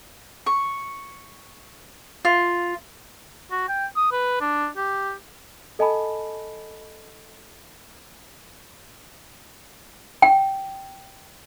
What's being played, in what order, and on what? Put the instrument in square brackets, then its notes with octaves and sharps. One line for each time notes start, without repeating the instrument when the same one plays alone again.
[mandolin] C#6
F4
[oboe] F#4
G5
D#6
B4
D4
G4
[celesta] A4 D#5 G#5 A5 B5
[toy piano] G5